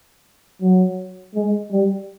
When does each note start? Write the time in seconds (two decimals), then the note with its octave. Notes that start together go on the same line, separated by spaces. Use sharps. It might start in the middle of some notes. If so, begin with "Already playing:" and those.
0.62 F#3
1.35 G#3
1.71 G3